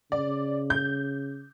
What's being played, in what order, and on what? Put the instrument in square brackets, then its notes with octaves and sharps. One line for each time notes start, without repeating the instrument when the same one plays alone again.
[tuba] C#3 [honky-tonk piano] D5
[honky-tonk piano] G6